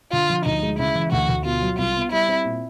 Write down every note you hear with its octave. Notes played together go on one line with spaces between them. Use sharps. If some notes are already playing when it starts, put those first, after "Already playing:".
D3 F4
F3
D2 D#4
G#3
C#3 E4
E3
D2 F#4
D2
B2 F4
F#3
C2 F4
B3
G3 E4
C4
A#2